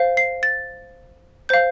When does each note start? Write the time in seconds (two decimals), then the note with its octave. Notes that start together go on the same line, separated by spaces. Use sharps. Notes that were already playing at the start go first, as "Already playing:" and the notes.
Already playing: C5 F5
0.17 C7
0.43 A6
1.49 C5 F5 G6